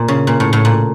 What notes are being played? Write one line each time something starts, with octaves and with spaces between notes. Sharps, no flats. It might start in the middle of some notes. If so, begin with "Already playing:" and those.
Already playing: A#2
C#3
A#2
A2
A2
A#2